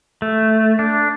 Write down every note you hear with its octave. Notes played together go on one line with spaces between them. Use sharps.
A3
D4